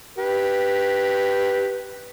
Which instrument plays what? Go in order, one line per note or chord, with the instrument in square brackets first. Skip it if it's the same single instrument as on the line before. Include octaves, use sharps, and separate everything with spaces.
[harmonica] G4 B4